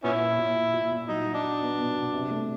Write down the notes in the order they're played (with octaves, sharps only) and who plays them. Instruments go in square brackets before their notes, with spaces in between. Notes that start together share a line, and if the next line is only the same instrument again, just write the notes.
[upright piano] A#2 [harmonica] B3 C#4 E4
[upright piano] A#2
A#2
A#2
A#2
A#2
[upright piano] F#3 [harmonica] D#4
[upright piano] F#3
[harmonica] D4
[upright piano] F#3
B3
B2
B2
C3
A3